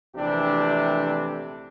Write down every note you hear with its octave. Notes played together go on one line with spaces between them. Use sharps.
A#1 C3 E3 A3 D4 G4